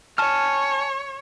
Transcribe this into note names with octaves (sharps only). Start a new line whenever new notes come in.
C#5 G#5 A5 F6